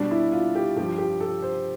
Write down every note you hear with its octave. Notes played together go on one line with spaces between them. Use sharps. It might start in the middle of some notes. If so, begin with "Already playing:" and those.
Already playing: B2 G3 D4
E4
F4
G4
G2 F3 G4
G4
A4
C5